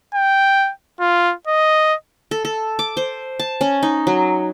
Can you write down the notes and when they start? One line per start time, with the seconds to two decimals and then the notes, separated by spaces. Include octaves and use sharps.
0.14 G5
1.00 F4
1.47 D#5
2.31 A4
2.45 A4
2.79 D6
2.97 C5
3.39 A5
3.61 C#4
3.83 D#4
4.07 F#3